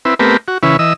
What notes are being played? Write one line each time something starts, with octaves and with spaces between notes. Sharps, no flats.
C4 E4 B4
A3 B3 C4 G4 A#4 B4
F#4
C#3 E3 C#4 E4 B4
E3 D#5 E6